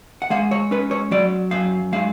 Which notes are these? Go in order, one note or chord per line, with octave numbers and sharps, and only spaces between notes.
F#5
G#3 F5
C#5
C#4 B4
C#5
F#3 D5
F#2 F5
G#3 F5